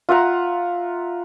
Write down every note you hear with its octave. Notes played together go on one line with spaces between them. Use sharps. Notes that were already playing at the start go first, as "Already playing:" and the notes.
F4 E5 F#5 A#5